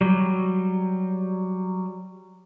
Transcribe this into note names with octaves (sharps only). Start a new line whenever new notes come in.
F#3 G3